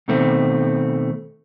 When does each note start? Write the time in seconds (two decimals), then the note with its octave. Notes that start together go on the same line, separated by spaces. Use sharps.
0.08 B2 D#3 A3 C4